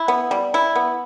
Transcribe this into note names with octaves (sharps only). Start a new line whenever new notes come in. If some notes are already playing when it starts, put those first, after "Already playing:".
Already playing: E4
B3
G3
E4
B3